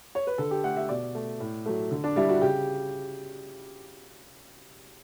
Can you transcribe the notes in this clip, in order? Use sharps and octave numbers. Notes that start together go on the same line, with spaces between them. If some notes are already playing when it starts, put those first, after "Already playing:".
C#5
B4
D3 A4
G4
A3 F#5
E5
B2 D5
A3
A2
F#3 A3
D3
D4
G3 E4
F#4
C#3 G4